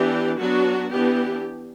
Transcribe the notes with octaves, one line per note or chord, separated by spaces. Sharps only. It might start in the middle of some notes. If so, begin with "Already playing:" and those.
Already playing: E3 B3 D4 G4
F#3 B3 D4 F#4
E3 B3 D4 G4